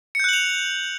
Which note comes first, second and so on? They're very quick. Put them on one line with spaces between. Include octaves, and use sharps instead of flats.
C#7 G6 F#6 F#7 F7